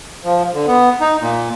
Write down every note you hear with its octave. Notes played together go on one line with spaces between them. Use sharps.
F3
D3
B3
D#4
A#2